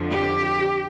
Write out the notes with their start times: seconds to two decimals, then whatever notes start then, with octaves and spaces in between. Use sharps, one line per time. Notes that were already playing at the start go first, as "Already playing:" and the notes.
Already playing: F2 D3 F3
0.12 G4